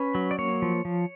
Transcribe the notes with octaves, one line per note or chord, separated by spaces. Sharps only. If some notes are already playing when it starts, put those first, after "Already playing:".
Already playing: C#4 B4
F#3
D5
A#3 C#5
F3
F3